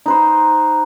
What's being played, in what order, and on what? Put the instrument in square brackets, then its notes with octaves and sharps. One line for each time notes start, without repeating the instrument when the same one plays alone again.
[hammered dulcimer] D#4 B4 C5